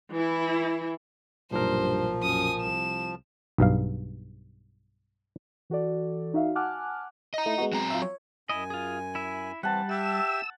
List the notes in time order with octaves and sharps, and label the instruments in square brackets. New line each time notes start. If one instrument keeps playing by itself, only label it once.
[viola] E3 E4
[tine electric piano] B1 A#2 A#4 [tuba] G2 [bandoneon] F3 [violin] C5
[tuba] F#2 [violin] G#5 D#6
[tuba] C2 [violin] E7
[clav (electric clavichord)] B1 G2 F5
[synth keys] E3 F#4 A4 D5
D#4 F#4 E5 F5
F#5 G#5 A5 D6 F6 F#6
[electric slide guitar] D#5 A#5
[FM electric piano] A3 E4
G#3 B3 F#4
[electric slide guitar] F#3 C4 A#5
[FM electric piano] F4 E5
C#5
[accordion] F#2 G#5 [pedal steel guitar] E4 D#5
[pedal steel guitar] F4 G#4
E4 E5
[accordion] E3 C4 [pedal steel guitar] G3 [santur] F#5 A5
[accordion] G4 E5 G5 [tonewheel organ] E6